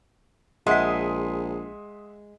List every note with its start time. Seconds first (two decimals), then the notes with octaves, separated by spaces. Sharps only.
0.67 A#1 G#3 E5 F#5 C6 D#6 B6